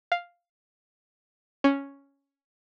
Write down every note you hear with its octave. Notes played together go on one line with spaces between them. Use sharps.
F5
C#4